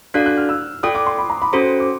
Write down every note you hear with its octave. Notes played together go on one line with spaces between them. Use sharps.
D4 F#4 A4 D5 F5 F#6
F#6
F6
E6
F4 A4 D5 G5 D#6
D6
C6
B5
A#5
B5
C#4 F#4 A4 C5 C6
D6